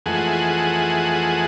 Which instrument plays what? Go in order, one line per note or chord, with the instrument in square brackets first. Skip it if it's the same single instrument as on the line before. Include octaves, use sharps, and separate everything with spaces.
[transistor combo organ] F2 E3 G#3 A3 G#4 F#5